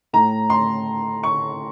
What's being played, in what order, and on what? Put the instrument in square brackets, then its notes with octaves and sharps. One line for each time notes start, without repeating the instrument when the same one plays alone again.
[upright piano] A2 A#5
C6
C#6